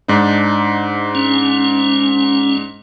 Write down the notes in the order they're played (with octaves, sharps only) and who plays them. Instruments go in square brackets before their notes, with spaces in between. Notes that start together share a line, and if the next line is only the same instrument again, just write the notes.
[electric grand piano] G#2 D4 D#4
[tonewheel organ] C#4